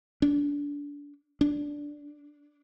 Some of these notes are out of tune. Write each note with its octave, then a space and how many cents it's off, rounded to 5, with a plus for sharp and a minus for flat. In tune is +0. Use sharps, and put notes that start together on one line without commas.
D4 -25
D4 -5